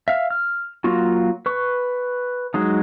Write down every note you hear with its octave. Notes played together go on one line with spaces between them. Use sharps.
E5 F5
F6
F#3 A#3 F4 F#4
B4 C#6
F#3 G#3 D#4